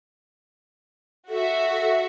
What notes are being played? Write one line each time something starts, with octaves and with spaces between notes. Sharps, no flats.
F#4 A4 E5